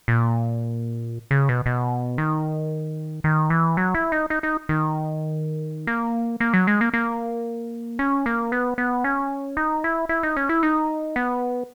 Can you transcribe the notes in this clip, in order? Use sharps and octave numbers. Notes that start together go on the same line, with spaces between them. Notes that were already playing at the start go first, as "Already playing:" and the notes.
A#2
C#3
B2
B2
D#3
D#3
E3
F#3
E4
D#4
D#4
D#4
D#3
A#3
A#3
F#3
G#3
A#3
A#3
C#4
A#3
B3
B3
C#4
D#4
E4
E4
D#4
C#4
E4
D#4
B3